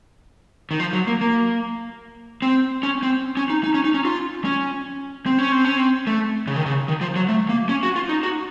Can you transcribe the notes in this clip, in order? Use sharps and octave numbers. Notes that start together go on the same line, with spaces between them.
D#3
F3
F#3
A#3
A#3
C4
C#4
C4
C#4
D#4
D#4
C#4
D#4
C#4
F4
C#4
C4
C#4
C4
C#4
C4
A3
C#3
D#3
C#3
D#3
F3
F#3
A3
A#3
C#4
F#4
F4
D#4
F#4